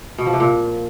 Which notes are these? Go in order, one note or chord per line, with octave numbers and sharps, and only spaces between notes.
B2
F3
C3
A#2